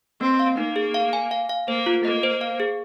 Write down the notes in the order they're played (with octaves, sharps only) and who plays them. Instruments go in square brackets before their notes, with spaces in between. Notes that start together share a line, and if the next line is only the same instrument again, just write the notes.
[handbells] A#3 [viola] C4
[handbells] F5
[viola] A#3 [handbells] D#4
[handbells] G#4
F5
G#5
F5
F5
[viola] A#3 [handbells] C5
[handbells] F4
[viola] A#3 [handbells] D#5
[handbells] C5
F5
G#4